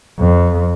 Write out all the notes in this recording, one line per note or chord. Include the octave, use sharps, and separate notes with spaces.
F2